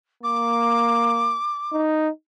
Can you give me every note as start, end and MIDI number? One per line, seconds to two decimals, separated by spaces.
0.23 1.37 58
0.23 1.80 86
1.73 2.09 63